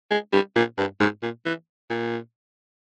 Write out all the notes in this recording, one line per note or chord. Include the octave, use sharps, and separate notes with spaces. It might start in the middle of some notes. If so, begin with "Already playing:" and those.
G#3
G3
A#2
G2
G#2
A#2
E3
A#2